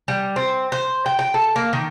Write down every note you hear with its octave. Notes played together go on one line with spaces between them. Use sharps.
G3
C4
C5
G5
G5
A4
A#3
D#3